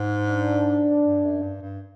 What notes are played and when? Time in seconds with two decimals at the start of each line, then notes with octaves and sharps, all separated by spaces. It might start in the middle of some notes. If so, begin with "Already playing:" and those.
Already playing: G#2
0.27 D4
1.05 G2
1.24 F#2
1.42 G2
1.62 G2